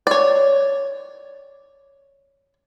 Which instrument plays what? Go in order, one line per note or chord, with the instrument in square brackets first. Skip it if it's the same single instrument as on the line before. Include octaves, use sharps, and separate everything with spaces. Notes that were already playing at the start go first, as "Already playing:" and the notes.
[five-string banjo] C#5 D5